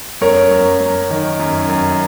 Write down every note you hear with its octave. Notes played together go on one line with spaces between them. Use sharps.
F#2 A#4 C#5
F#2
F#2
D#3
F#2
F#2